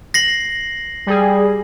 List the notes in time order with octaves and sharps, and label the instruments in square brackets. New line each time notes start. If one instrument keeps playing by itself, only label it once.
[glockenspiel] A#6 C7 F#7
[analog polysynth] G3 G#4